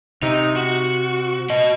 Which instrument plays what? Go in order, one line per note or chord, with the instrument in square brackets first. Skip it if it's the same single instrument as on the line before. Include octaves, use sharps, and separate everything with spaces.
[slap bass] C3 [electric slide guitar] D#4
[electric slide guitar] F#4
F#4 D#5